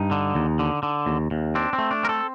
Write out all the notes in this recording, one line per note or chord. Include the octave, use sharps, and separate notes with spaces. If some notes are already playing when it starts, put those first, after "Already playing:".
Already playing: G2 D#4
D3
D#2
D3
D3
D#2
D#2
C4 D4
C4
A3
D4
C4 A#4
A4